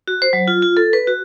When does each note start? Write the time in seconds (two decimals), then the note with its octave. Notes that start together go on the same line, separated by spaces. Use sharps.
0.08 F#4
0.22 C5
0.33 F#3
0.48 F4
0.62 F4
0.77 A4
0.93 B4
1.07 F#4